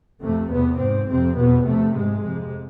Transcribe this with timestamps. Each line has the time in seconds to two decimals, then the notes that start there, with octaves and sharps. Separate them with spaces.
0.21 F2 C3 A3
0.51 E2 C3 B3
0.78 G#2 C4
1.08 F2 C3 C4
1.37 E2 B2 B3
1.65 F2 C3 A3
1.94 G#2 G#3
2.23 F2 C3